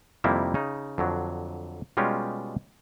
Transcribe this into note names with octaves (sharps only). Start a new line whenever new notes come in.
F2 C3 D#3 G3 A#3 E4
C#3 D#4
F2 D3 F#3
B2 G3 G#3 C#4 F4 G4